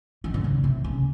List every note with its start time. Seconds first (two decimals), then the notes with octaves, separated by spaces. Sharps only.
0.24 D#3
0.34 D3
0.44 C#3
0.64 C3
0.84 C#3